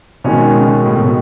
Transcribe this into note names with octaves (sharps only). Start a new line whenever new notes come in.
B2 D#3 G#3 C#4
C#3
A2
B2